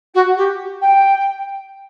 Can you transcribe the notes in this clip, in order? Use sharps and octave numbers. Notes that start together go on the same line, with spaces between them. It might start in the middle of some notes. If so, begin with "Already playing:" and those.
F#4
G4
G5